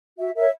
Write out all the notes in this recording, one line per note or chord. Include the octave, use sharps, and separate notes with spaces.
F#4 E5
A#4 C#5 E5